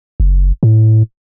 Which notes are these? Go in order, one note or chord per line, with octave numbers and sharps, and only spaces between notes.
F#1
A2